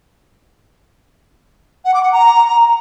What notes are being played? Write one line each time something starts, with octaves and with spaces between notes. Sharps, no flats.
F#5
D6
F#5
A#5